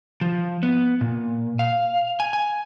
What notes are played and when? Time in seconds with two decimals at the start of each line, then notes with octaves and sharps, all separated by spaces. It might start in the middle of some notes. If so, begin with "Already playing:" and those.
0.21 F3
0.63 B3
1.01 A#2
1.59 F5
2.20 G#5
2.33 G#5